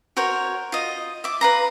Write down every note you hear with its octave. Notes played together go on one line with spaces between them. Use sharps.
F#4 A#4 C5 C#5
F4 D#5
E5 D6
B4 F5 A#5